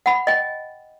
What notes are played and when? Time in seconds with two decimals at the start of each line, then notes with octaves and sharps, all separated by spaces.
0.06 F#5 B5
0.27 D#5 G5